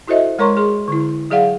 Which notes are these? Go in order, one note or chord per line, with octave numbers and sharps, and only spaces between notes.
E4 F#4 A4 C5 D#5 E5
G#3 A#4 C#5 A#5 C6 C#6
G#4 C6
D3 E4
F#3 G#4 D5 F5 F#5